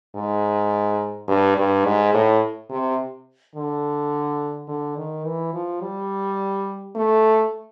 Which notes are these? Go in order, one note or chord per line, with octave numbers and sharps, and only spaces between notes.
G#2
G2
G2
G#2
A2
C3
D3
D3
D#3
E3
F3
G3
A3